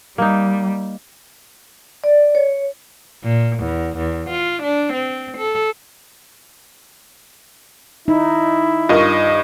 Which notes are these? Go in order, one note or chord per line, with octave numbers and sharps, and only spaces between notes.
G3 A#3 D#4
D5
C#5
A#2
E2
E2
F4
D4
C4
A4
D#4 E4
G2 F4 A#4 D#5 C#6